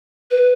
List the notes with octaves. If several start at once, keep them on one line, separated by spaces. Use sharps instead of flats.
B4